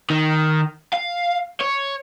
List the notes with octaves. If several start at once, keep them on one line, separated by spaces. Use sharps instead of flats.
D#3
F5
C#5